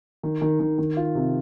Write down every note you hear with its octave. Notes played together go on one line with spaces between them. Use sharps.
D#3
D#3
D#3
D#3
F4
C3